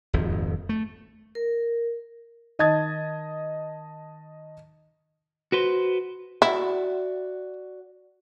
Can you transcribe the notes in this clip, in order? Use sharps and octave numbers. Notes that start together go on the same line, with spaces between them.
D#1 G#1 F2
A3
A#4
D#3 D#5 A5 D#6 G#6 A6
F#4 B4 C5
E4 F#4 D5